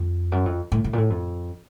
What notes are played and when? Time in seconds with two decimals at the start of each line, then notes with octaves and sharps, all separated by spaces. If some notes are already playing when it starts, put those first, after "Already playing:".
Already playing: F2
0.32 F#2
0.46 F2
0.72 A2
0.84 A2
0.93 A#2
0.98 A2
1.10 F2